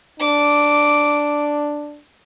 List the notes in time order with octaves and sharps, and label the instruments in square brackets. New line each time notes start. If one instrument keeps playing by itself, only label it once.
[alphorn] D4 [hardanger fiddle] D6